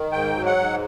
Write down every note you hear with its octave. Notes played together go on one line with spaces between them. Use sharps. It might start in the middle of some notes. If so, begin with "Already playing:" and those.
Already playing: D#3
G#2 G5
F#3
F#5
G#2